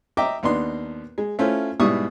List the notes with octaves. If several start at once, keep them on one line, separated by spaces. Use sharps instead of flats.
D#5 E5 G5 A#5 D6
D#2 B3 D4 D#4 C6
G#3
A3 C#4 E4 F4 C5
G#2 B2 G3 E4 C#6 D#6